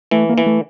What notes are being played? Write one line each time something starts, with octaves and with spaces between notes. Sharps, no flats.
E3 A3
A#3
E3
A3